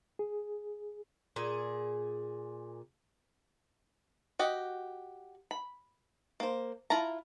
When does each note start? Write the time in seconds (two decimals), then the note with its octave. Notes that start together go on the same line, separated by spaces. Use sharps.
0.19 G#4
1.36 A#2 G#4
4.39 F#4 G4 D#5
5.51 B5
6.40 A#3 C5
6.90 E4 F4 A5 A#5